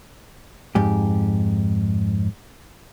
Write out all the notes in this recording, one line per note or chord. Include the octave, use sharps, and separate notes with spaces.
F2 G#2 G4